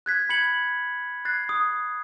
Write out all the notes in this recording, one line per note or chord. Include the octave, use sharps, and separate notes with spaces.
F#6 G#6 B6
B5 G#6 C#7 F#7
F#6 G#6 A6 C7
D#6